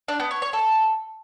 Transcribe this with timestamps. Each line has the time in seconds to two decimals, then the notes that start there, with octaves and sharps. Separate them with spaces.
0.08 D4
0.20 B3
0.31 C#5
0.42 C#5
0.53 A4